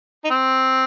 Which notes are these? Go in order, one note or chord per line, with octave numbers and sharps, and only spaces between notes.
D#4
C4